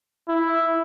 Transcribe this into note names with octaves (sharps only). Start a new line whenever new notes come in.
E4